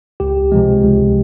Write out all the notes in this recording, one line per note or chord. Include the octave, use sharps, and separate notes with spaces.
C#2 G4
C3 F3 G#3
C#2